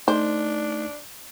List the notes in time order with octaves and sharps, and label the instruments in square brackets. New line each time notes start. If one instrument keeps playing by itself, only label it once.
[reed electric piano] A3 D#4 [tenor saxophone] D4 [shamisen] C5